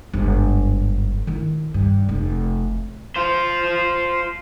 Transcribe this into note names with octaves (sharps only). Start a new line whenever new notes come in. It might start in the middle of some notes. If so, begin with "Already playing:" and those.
G1 G#2
D#3 E4
G2
F1
F4 C5